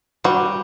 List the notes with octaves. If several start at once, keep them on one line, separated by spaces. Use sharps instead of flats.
G3 F#4